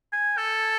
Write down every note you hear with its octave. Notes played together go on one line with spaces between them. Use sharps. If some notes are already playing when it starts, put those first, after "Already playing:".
G#5
A4